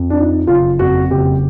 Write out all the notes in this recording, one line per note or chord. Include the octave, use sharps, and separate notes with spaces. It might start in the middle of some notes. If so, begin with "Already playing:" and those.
Already playing: F2
D4
F3 D#4
F#1 F4
F2 F#4
F#1 G4